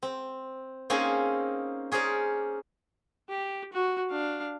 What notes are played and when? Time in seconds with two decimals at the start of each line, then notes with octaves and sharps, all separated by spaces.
0.03 C4
0.90 A#3 C4 C#4 D#4 G#4 G#5
1.92 C#4 G#4 A#4 C5 D5
3.29 G4
3.73 F#4
4.11 D4 F5